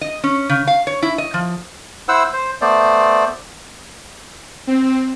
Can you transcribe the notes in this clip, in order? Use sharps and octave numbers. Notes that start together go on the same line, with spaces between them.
D#5
C#4
C#3
F5
C#5
E4
D#5
F3
E4 C5 F#5 E6
C5
A3 B3 C5 D5
C4